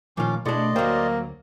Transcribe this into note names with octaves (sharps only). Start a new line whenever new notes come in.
A#2 D#3 F3 C#4 F4 D6
B2 A3 D4 E4 G#4 D5 D#5 C6
D2 F#3 A#3 A#4 C5 G5